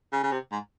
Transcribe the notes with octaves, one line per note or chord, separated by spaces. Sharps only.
C#3
C#3
C3
G#2